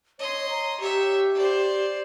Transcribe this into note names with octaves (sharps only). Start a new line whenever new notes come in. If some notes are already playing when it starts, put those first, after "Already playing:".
C#5 D#5 C6
A#5
G4 C#5 E5
C5 D5